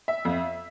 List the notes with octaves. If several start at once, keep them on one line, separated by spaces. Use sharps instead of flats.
E5
F2